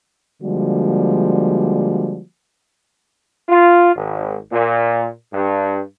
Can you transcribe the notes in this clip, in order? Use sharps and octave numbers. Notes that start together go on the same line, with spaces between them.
D3 F3 G3 G#3 A#3 F#4
F4
G#1
A#2
G2